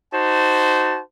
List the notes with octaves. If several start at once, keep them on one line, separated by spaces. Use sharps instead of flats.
D#4 F#4 C5 A5